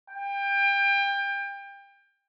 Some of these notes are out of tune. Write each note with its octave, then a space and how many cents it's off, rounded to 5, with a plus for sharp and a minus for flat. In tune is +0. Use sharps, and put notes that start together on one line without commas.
G5 +25